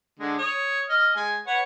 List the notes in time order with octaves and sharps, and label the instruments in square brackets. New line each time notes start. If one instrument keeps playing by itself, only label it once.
[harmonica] D3 G#3
C#5 D#6
D#5 F6
G#3 G#5
B4 C#5 F#5